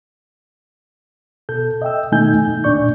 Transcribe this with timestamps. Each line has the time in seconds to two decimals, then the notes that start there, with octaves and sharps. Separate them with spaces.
1.49 B2 A4 G6
1.82 D#5 E5 G5 E6
2.12 B2 D#3 A3 D#4 G#5 G6
2.33 F2
2.64 C2 A#2 D4 D5 C#6 G6